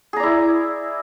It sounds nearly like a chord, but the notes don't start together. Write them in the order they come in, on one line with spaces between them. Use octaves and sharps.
G#4 A#5 D5 E4